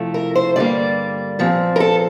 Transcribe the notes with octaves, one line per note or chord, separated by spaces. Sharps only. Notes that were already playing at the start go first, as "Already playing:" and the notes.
Already playing: C3 F3 A3 E4
A#4
C5
G2 D3 G3 A#3 D5
A#2 F3 C4
A#4
A4